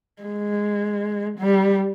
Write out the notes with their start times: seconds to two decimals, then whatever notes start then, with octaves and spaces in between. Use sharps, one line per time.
0.22 G#3
1.39 G3